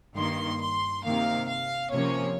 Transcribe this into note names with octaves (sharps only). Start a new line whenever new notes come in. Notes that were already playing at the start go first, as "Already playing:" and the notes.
G2 D#3 A#3 C6
C6
C3 D#3 A#3 F5
F5
C3 F3 A#3 C#4 C#5